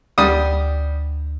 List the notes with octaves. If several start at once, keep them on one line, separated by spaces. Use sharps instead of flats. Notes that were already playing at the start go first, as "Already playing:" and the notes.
D2 G3 D#6